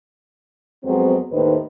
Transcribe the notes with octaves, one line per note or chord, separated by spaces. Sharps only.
F2 F#3 G#3 B3 C4
D#2 A2 D#3 D#4 B4 C5